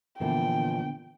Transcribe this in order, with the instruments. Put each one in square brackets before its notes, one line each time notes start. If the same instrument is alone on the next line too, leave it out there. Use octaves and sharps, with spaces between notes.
[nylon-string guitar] A#2 E3 F3 [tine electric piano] D3 B3 D4 [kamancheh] G5